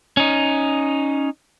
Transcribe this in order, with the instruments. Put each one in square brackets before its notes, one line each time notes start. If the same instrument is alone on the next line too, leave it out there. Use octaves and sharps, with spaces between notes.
[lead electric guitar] C#4 D#4